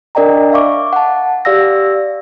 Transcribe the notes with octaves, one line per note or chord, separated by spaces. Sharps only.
D4 A#4 D5 D#5 G5 A#5
E5 F5 C#6 D6
F#5 A5
G4 D5 F5 E6 A#6